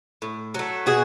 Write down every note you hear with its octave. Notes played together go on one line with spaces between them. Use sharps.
A2
F#3 A3
B2 F#4 G#4